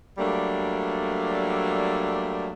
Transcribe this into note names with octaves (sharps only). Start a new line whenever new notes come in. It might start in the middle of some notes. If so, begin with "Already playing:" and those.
F#3 G3 A3 A#3 D4